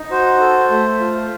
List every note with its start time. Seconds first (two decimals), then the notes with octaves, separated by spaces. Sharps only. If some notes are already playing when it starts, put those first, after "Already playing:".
Already playing: D#4
0.11 F#4 C5
0.40 A4
0.70 A3
1.00 F4